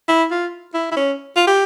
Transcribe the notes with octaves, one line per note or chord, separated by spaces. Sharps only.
E4
F4
E4
E4
C#4
F4
G4